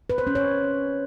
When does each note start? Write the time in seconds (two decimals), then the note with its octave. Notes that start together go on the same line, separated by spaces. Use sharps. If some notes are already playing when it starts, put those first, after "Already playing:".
0.10 B4
0.18 C5
0.27 C#4
0.35 C#5